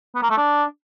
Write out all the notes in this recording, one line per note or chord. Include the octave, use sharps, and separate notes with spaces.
B3
A#3
A3
D4